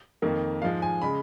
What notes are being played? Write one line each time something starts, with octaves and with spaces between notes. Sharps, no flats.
F2 D#3 A#3
G#2 F3 G#3 F5
G#5
C#3 G#3 B5